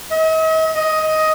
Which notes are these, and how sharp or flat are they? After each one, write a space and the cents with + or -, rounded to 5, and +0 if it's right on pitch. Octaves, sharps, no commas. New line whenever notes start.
D#5 +45
D#5 +10